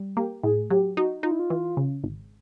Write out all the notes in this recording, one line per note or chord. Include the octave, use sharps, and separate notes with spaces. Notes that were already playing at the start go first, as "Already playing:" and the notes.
Already playing: G3
A#3 G4
A2 G#4
F#3 G4
D#4 F#4
D#4 F4
E4
F4
E3
C#3
G#1